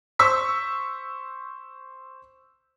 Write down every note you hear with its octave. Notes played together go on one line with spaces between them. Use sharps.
C5 C#6 E6 B6